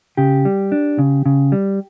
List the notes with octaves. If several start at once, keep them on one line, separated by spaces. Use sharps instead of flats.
C#3 G4
G3
D4
C#3
C#3
G3